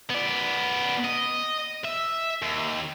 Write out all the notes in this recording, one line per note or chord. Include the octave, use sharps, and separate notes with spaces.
B3 D5
D#5
E5
D#2